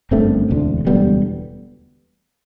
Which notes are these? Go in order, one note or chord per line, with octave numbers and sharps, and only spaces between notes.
G1 F#2 D3 A3 C4
E1 D2 D3
E1 D2 D3 G3 B3